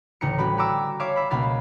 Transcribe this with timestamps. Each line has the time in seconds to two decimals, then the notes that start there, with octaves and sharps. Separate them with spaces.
0.21 A1 D2 C#3 A3 A#5 C#7
0.38 G3 C#4 F#4 B4 D5 B5
0.57 F#4 G4 A#5 B5 D6 E6
1.00 C#5 E5 F5 A5 C#6 D6
1.16 E5 B5
1.31 C#2 B2 A#3 F5 B5 A6